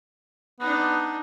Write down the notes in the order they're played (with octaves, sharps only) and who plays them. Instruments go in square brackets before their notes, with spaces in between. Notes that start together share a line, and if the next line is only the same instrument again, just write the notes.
[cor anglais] B3 [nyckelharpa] D4 D#4